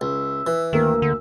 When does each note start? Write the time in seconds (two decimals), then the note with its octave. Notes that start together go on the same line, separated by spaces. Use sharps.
0.01 C#2 E5
0.47 E3
0.73 D2 D#3 A#3 E5
1.02 D3 E5